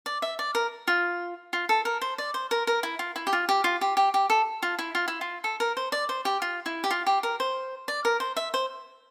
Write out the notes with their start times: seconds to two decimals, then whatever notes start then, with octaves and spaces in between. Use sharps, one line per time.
0.06 D5
0.22 E5
0.39 D5
0.55 A#4
0.87 F4
1.53 F4
1.69 A4
1.85 A#4
2.01 C5
2.18 D5
2.34 C5
2.51 A#4
2.67 A#4
2.83 E4
2.99 F4
3.16 E4
3.27 G4
3.33 F4
3.49 G4
3.64 F4
3.81 G4
3.97 G4
4.14 G4
4.30 A4
4.63 F4
4.79 E4
4.95 F4
5.08 E4
5.21 F4
5.44 A4
5.60 A#4
5.77 C5
5.92 D5
6.09 C5
6.25 G4
6.42 F4
6.66 E4
6.84 G4
6.91 F4
7.07 G4
7.23 A#4
7.40 C5
7.88 D5
8.05 A#4
8.20 C5
8.36 E5
8.54 C5